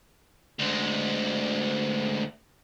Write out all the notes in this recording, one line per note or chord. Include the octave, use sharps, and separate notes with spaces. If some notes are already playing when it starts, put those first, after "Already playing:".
D2 G#3